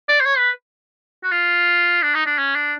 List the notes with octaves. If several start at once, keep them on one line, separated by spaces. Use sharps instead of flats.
D5
C5
C#5
B4
F#4
F4
D4
D#4
D4
C#4
D4